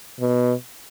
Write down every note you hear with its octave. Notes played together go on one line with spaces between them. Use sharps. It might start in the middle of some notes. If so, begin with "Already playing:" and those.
B2